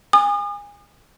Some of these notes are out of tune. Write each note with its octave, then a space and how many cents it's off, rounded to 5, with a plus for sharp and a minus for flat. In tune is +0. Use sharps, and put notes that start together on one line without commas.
G#5 -25 D#6 -40